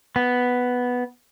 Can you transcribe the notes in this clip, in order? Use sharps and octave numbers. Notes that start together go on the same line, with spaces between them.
B3